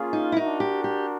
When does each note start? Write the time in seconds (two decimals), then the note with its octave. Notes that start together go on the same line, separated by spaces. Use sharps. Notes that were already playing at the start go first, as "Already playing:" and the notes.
Already playing: A#3 C#4 F4 G#4
0.13 D#4
0.32 E4
0.36 D4 D#4 F#4 A#4
0.60 G4
0.84 G4